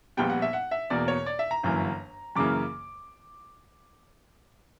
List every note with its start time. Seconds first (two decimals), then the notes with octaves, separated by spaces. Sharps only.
0.17 A#1 A#2 G3 B3 G5
0.30 F#5
0.42 E5
0.53 F#5
0.71 E5
0.90 E2 B2 A#3 D5
1.08 C#5
1.26 D5
1.39 E5
1.51 A#5
1.63 G1 F#2 E3 A#3
2.36 F#2 C#3 E3 A#3 D6